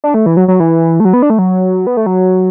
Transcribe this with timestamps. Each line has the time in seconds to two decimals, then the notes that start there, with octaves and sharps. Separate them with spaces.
0.04 D4
0.14 A3
0.26 E3
0.37 F#3
0.48 F#3
0.60 E3
1.00 A3
1.05 F#3
1.13 B3
1.22 D4
1.30 A3
1.39 F#3
1.87 B3
1.97 A3
2.06 F#3